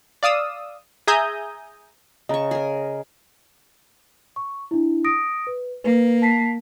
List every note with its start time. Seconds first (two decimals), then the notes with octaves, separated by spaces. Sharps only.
0.23 D5 F5 D#6 E6
1.07 G#4 E5 G#5 A#5 D#6 G6
2.29 C#3 D#5 A#5 C#6
2.51 G#4 A#4
4.36 C#6
4.71 D4 E4
5.04 D#6 A#6 D7
5.47 B4
5.84 A#3 B4
6.22 A5 B6 C7